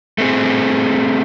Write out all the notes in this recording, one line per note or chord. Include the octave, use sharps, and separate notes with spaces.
A3 C4 G#4